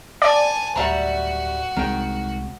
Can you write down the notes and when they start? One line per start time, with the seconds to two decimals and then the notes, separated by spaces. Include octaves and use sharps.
0.22 D5 G#5 A5
0.76 D1 G3 F#4 E5 A#5
1.76 C2 D#3 G#3 C4 G5